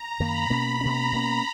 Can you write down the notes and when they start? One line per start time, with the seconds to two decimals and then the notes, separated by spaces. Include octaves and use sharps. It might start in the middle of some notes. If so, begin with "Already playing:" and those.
Already playing: A#5
0.19 F#2 D#3 A#3 B5
0.50 B2 A#3 C#4
0.81 B2 A#3 C#4 A#5
1.12 B2 A#3 C#4